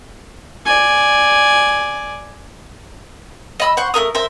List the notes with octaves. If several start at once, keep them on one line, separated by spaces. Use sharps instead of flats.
D5 G#5
D#5 B5 E6
C5 F#5 C#6
A3 D4 A#4 D#6
A#4 C5 E5